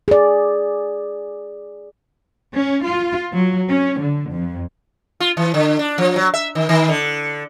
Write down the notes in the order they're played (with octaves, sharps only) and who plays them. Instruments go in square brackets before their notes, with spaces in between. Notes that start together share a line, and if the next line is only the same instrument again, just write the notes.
[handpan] G#4 D5
[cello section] C#4
F4
F#3
C#4
D3
F2
[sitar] F4
E3
D3
D4
F3
F#3
E5
D#3
D#3
D3